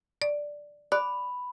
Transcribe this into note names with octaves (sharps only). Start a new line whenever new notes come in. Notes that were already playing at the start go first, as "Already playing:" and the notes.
D5
D5 B5 F#6